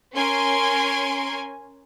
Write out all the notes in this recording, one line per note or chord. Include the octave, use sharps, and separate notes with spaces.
C#4 A#4 G#5 C6 D7